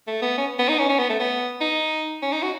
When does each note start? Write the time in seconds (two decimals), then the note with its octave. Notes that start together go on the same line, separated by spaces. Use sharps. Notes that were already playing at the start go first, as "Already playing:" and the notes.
0.07 A3
0.22 B3
0.37 C#4
0.59 B3
0.68 D#4
0.79 C#4
0.89 C#4
0.99 B3
1.09 A3
1.19 B3
1.61 D#4
2.22 C#4
2.32 D#4
2.43 F#4